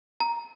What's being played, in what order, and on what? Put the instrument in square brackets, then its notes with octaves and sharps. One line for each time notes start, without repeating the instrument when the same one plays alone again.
[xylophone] A#5